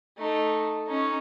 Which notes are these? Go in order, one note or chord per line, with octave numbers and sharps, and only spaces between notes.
A3 D#4
C#4 D#4